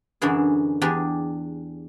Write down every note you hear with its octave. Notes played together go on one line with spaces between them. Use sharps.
F#2 D3 E3 D4 G#4
E2 D4 G4 G#4 G#5